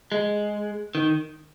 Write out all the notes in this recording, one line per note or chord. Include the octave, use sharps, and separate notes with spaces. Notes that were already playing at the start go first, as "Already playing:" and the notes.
G#3
D#3